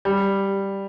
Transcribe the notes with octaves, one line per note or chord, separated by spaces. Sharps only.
G3